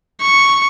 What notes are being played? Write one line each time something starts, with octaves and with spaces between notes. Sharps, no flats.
C#6